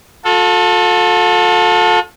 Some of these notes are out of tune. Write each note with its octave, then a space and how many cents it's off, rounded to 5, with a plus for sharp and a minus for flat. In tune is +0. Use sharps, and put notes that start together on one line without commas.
F4 +45 A4 +0